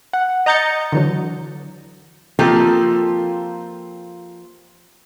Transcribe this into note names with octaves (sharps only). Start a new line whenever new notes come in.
F#5
D#5 A#5 G6 A6 C#7
D3 E3 F#3
F3 A#3 C4 F4 G4 A4